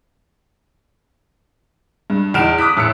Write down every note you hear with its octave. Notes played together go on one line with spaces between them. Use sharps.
G2
E2 D#4 F6 D7 E7
D6 D#6 F#6 B6
A1 E6 C#7